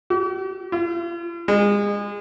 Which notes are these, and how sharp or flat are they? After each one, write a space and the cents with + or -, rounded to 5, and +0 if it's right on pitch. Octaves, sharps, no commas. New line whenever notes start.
G4 -45
F4 -45
G#3 -30